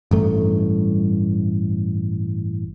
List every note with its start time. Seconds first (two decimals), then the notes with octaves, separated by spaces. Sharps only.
0.11 A1 G2 A3